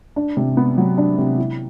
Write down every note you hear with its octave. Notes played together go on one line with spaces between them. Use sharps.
D4
C3
B3
F#3
D4
C3
E4